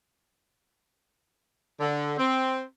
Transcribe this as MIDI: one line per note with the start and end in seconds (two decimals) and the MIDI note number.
1.80 2.14 50
2.18 2.63 60